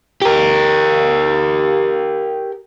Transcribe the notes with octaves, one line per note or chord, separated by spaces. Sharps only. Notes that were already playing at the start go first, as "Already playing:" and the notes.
G4 A#4